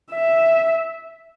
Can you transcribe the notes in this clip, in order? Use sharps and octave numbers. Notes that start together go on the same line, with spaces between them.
E5